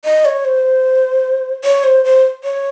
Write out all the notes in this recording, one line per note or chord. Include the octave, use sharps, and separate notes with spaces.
D#5
C#5
C5
C#5
C5
C5
C#5